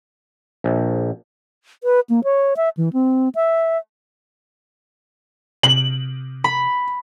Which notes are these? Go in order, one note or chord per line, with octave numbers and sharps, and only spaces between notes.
A#1
B4
A#3
C#5
E5
E3
C4
E5
C3 F#7
B5